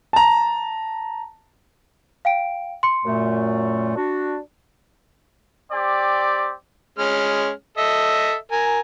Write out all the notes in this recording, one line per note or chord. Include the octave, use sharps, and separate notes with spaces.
A5 A#5
F5 G5 D7
C6 C#7
F#2 A#2 A3
D4 F#4
C4 G4 D5
G#3 C#4 F6
A4 D#5 E5
A#4 G#5